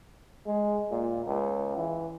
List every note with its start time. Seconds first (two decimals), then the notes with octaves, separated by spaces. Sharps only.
0.46 G#3
0.91 A#2
1.26 C#2
1.77 E3